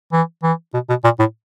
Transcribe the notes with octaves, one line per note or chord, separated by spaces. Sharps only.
E3
E3
B2
B2
A#2
A2